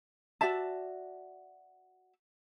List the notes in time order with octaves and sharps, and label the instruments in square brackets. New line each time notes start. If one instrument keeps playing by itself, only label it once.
[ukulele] F#4 D5 E5 A5